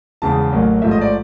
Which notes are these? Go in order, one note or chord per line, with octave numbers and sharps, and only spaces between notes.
E1 E2 C#3 E3 G#3 A5
A1 A2 F#3 A#3
A1 G#2 F3 A3 E5
D#5
D5